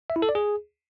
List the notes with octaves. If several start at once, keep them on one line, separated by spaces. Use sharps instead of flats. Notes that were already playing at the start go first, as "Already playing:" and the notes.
E5
E4
A4
D5
G#4